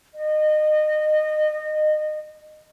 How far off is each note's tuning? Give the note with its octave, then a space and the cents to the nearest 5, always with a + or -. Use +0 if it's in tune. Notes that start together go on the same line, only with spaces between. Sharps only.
D#5 -25